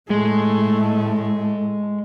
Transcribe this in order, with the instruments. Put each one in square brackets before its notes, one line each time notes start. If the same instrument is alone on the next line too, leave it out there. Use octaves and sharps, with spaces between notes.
[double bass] A2 [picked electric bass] G#3 [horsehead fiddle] A3